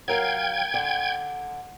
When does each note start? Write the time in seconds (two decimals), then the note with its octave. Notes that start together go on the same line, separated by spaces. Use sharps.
0.08 F#3 A#4 F5 G5 G#6
0.74 D3